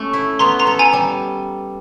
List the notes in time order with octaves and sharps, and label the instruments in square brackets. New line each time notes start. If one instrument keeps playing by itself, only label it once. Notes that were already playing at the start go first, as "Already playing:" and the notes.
Already playing: [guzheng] A3 C#4
E4
[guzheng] B3 [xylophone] A#5 C6
[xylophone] A#5 C6
[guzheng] A4
[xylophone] G#5 A#5
[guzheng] G3